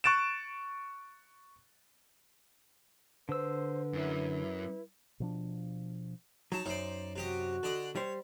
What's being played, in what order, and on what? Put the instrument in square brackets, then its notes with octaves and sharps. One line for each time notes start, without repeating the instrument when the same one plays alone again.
[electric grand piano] C#6 F#6 A6 D7 E7
[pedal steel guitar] D3 E6 [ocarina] B4 [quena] C5
[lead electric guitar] F#2 [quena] E4
[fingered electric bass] B2 F3 D4
[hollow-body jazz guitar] F#3 [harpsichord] D#4 A5
[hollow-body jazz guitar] F#2 [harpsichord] D#4 C5 D5
[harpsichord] C3 G4 D#5 [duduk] F#4
[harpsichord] D3 D5 D#5
[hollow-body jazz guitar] G3 C5 [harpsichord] C#5